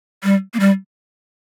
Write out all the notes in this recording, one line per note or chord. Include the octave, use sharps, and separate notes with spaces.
G3
A#3
G3